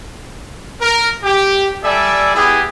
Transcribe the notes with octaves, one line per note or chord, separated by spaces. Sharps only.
A#4
G4
G3 A4 D5 E5 G#5
B3 E4 G4 G#4